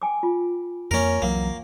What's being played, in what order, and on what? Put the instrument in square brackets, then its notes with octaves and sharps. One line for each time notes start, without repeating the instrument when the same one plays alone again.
[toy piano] G5 G#5 D6
F4
[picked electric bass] F2 A#3 [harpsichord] C#4 A#4
[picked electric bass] C2 E3 F#3 [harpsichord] A#3 [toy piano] F#5